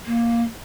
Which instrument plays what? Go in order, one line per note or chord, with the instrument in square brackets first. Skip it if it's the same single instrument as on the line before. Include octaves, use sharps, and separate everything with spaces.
[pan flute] A#3